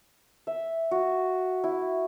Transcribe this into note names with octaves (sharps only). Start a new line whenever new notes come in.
E5
F#4
E4